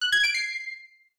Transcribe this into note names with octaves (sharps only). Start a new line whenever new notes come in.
F#6
G#6
D7
C7